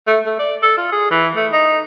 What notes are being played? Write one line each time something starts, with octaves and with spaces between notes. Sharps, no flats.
A3
A3
D5
A4
F4
G#4
E3
A3
D#4